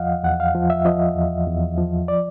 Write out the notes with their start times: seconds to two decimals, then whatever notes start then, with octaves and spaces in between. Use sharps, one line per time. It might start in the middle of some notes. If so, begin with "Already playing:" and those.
Already playing: E2 F3 D#5 F5 F#5
0.24 E2 F#5
0.40 F5
0.55 F3
0.70 E5
0.85 F3 D#5
1.16 E2
1.47 E2
1.78 F3
2.08 D5